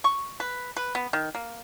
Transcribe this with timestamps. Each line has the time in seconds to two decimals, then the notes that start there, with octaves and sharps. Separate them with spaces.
0.04 C#6
0.40 B4
0.77 B4
0.95 B3
1.13 D#3
1.35 A#3